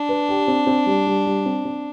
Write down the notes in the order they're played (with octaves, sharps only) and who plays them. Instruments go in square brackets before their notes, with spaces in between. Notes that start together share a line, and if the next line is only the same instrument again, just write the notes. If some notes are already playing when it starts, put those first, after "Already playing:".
Already playing: [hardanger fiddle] D4
[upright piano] B4
G4
C4
C4
G3
G3
G3
C4
C4